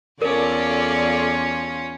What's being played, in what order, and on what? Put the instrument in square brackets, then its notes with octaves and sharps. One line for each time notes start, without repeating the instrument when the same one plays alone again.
[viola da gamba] E2 F4 [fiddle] C#4 [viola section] A4 D5 [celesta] A#4